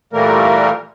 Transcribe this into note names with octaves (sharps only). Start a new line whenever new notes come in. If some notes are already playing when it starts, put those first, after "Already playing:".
A#2 E3 G3 A3 A#3 A#4